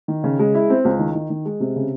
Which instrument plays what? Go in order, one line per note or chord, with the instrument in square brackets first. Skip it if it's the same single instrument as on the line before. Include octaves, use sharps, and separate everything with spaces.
[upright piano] D#3
C#3
G#3
E4
C4
C#2
D#3
D#3
D#3
G#3
C3
C#3